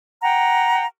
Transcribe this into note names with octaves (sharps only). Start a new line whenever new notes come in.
F#5 G5 A#5